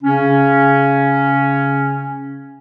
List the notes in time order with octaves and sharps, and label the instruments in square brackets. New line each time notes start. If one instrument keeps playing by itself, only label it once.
[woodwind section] C#3 C#4